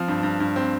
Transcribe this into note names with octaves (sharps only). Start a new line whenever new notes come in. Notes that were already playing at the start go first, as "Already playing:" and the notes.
Already playing: F3 C4
G2
G2
G2
C4